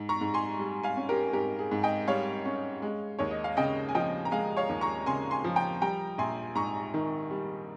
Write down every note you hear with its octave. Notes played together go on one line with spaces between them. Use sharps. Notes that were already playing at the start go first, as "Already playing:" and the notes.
Already playing: G#2
A#5 C#6
G#2
G#5 C6
G3
F5 G#5
C#4
G4 A#4
G#2 G4 A#4
G#4
G#2
D#5 G5
G3 C#5 F5
C#4
G#3
D#2 C#5
D#5
F5
C#3 D#5 G5
G#5
F3 D#5 G5
A#5
G#3 F5 G#5
C#5 F5
D#2
A#5 C#6
C#3 G#5 C6
G#5 C6
F3
G5 A#5
G3 G5 A#5
A#1 G#5 C6
G#2 A#5 C#6
D#3
G3